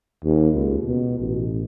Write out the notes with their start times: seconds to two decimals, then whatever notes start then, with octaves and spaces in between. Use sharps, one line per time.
0.24 D#2
0.54 C#2
0.86 B2
1.19 A1